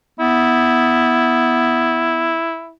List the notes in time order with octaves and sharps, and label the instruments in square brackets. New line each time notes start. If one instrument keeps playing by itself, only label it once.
[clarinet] B3 [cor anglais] E4